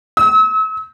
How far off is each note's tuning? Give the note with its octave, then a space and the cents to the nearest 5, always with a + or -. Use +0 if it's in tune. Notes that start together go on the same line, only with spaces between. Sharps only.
E6 -40